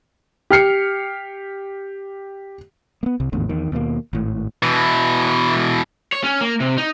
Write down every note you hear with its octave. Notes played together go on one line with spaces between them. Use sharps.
G4 F6 C7 C#7
A#3 B3
C2 C3
G#1 E2 A2 D3
E2 D#3
D#2 B2 D3 A#3
G#1 A2
B2 E3
C#5
C#4
A#3
C3
D#4